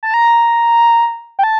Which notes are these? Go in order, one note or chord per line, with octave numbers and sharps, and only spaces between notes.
A5
A#5
G5
A5